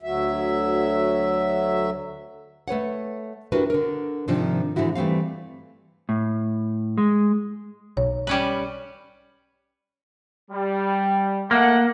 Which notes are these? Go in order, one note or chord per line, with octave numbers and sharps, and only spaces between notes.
D2 F#3 E5
A3 B4 C#5 F#5
D4 E4 F#4 G4 A#4 B4
D3 A#4
G#2 C3 D#3 F3 D4
G#2 D3 E3 E4 F#4
E3 G3 A3 C4 F5
A2
G#3
B1 C#5
G3 C#4 B4
G3
A3 A#3 F#5